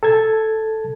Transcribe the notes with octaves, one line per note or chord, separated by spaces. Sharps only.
A4 A5 G#6